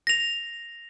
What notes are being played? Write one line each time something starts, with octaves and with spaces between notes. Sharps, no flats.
A#6 F7